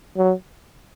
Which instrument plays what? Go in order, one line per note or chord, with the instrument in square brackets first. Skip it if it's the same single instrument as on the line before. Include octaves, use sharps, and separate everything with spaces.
[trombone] F#3